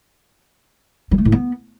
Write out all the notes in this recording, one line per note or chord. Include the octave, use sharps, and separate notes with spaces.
F#3
A3
A2
B3